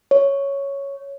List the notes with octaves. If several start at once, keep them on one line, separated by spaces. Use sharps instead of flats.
C#5